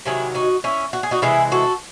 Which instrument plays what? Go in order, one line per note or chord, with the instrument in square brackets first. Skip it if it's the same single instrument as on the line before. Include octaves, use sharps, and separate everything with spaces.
[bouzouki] C3 D#3 F#3 E4 G#4
D#4 F#4
C#4 E4
F#4
G#4
D#4 F#4
C3 E3 G#3 E4 G#4
F#4 A4